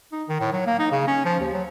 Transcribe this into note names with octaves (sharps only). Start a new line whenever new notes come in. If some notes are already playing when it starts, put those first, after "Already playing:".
D#4
D#3
A2
F#3
A#3
D#4
C#3
C#4
F3
D#2
F#3